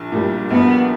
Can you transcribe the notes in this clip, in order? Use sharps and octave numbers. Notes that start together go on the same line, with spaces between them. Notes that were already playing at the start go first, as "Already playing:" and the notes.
Already playing: A#1
A#2 G3
A#1 B3